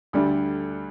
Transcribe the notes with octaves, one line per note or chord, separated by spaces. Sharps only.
D2 D3 G3 D4